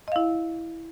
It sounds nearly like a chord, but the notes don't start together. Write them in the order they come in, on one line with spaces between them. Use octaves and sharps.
D#5 F5 E4